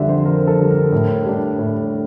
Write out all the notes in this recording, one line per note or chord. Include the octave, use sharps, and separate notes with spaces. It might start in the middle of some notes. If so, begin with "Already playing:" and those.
Already playing: F2 D3 G3 D5 E5
C5
F2 A#4
A4
D3 G3
A#4
A2
G3 D4
A2